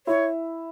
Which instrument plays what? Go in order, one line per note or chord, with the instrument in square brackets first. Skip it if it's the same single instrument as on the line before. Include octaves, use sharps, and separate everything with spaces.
[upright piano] E4 [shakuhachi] C#5